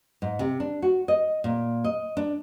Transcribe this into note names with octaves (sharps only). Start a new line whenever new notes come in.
G#2
C3
D4
F#4
D#5
A#2
D#5
D4